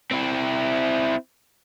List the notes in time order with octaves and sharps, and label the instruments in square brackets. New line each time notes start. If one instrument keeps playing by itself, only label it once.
[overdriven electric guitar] C4 E4